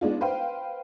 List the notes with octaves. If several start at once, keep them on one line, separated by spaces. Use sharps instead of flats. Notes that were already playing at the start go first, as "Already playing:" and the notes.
G#3 B3 D4 D#4 F4
B4 C5 F5 G5